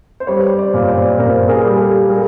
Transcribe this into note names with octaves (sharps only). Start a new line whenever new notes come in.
C5
G3 B4 C#5
C5 D5
A#2
C5 D5
A#2 A#4 C5
G#4 A#4
G3
G4 A4
G#3 G#4 A#4